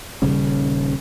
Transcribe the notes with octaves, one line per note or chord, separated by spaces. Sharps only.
D#1 C#3 G3 C#4